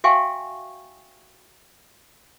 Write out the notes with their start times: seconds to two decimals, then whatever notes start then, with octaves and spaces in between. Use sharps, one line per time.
0.04 F#4 E5 F5 G5 G#5 C#6